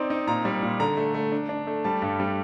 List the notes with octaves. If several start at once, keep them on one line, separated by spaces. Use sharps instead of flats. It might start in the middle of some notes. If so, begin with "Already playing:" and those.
Already playing: C4 D#4 D5
D#4
A#2 A#5
G3
A#2
D3 A#5
A3
A3
D4
D4
A3
G3 A5
G2
G3